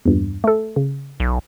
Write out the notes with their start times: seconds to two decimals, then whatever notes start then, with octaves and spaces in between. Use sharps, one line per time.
0.05 E2 G2 A#2
0.44 A3 A4
0.76 C#3
1.20 B1